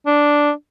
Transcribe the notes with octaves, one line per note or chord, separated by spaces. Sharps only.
D4